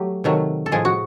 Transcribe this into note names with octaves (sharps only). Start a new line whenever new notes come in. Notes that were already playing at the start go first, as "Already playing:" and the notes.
Already playing: F#3 A3 G4
C3 D#3 F#3 A3
A4
A2 F3 G#3 G#4
F#4